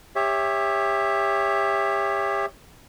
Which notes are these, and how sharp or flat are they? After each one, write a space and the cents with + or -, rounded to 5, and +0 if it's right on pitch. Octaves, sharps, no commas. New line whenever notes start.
G4 +30 C#5 +0 E5 +0